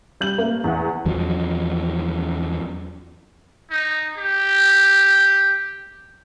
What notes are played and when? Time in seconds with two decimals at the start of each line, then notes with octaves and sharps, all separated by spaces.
0.20 G3 G6 F#7
0.38 A3 A#3
0.64 E2 F#5
1.06 E2 F3 F#3
3.71 D#4
4.18 G4